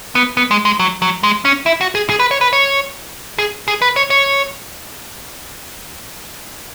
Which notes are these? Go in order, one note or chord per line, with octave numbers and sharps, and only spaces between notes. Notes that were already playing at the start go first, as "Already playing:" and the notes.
B3
B3
G#3
G#3
F#3
F#3
G#3
C#4
E4
F#4
G#4
G#4
B4
C#5
B4
C#5
G#4
G#4
B4
C#5
C#5